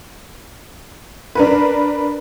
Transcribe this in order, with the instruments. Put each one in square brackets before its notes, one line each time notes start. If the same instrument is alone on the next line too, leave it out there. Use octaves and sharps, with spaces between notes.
[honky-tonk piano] D4 A#4 B4